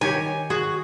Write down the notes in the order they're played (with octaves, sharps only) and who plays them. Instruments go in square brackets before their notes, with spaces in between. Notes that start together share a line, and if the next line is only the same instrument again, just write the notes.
[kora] D#3 G4 C#5 [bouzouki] G#5
[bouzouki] F#4 [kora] G#4